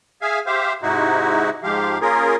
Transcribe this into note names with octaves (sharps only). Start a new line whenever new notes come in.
G#4 E5 F5 G#5
G4 C5 E5 F5
G#2 C3 D#4 E4 F#4
G#2 F3 G4 F5
A#3 C#4 F4 G#4 A#4